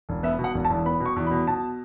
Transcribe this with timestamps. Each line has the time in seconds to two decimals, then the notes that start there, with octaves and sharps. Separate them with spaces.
0.09 E1
0.23 B3 E5
0.39 B2
0.44 F#5
0.54 E1
0.65 A5
0.70 E2
0.86 B3 B5
1.00 B2
1.06 C#6
1.16 E2
1.27 B5
1.31 B2
1.47 B2 A5